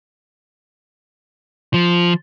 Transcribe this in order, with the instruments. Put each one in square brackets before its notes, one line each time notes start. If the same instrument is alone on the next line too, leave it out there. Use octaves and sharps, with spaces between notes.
[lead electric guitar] F3